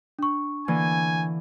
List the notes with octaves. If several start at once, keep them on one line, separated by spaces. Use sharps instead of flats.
D4 C#6
D3 E3 A#3 G#5